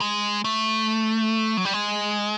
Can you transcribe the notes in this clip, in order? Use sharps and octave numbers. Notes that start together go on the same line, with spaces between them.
G#3
A3
F#3
G3
G#3